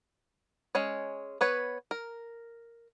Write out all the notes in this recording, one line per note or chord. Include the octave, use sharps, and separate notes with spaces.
G#3 C#4 C#5
B3 B4 C#5
A#4